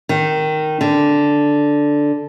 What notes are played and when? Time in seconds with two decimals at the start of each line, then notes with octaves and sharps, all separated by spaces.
0.09 D#3
0.81 D3